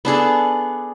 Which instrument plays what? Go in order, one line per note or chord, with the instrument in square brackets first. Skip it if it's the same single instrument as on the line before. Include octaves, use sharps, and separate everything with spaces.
[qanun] B3 D4 G#4 A4